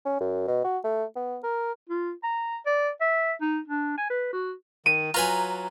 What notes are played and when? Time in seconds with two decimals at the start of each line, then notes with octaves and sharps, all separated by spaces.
0.05 C#4
0.21 F#2
0.48 B2
0.64 F#4
0.84 A3
1.16 B3
1.44 A#4
1.89 F4
2.24 A#5
2.66 D5
3.01 E5
3.41 D#4
3.68 D4
3.98 G#5
4.10 B4
4.32 F#4
4.86 D#3 D#7
5.14 F#3 F4 B4 G#5 A#5